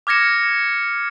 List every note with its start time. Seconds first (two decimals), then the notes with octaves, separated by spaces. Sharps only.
0.07 D6 F6 G#6 A#6 C#7 E7